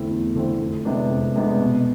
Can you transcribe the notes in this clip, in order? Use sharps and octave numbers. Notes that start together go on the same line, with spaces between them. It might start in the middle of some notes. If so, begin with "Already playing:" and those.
Already playing: E2 D3 A3 C4 E4
E2
D3 A3 C4 E4
F2
C3 G#3 B3 D4
F2
C3 G#3 B3 D4
B2